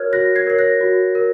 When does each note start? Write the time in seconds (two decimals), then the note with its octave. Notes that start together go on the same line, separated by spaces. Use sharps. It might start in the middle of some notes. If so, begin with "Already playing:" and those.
Already playing: F#4 A#4 C#5 F6 F#6 G#6
0.13 F#4 F#6 A#6
0.36 G#6 C7
0.47 A#4 C#5 C7
0.59 F#6 A#6
0.81 F#4
1.15 A#4